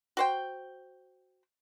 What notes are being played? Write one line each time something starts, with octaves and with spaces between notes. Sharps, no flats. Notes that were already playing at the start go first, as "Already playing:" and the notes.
F#4 C5 G5